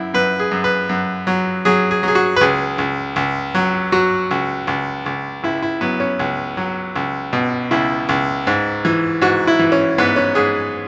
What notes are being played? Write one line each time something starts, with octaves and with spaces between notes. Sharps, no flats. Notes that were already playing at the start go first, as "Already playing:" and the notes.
Already playing: F#2 E4
F#2 B4
G#4
F#2
B4
F#2
F#3
F#3 G#4
G#4
F#3 G#4
F#4
B4
C#2 G#4
C#2
C#2
F#3
F#3 F#4
C#2
C#2
C#2
C#2 E4
E4
F#3 B3
C#4
C#2
F#3
C#2
B2
C#2 E4
C#2
G#2
E3
G#2 F#4
E4
E3
C#4
G#2 B3
C#4
G#2 G#4